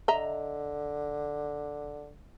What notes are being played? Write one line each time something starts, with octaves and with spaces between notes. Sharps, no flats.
D3 D#5 E5 A#5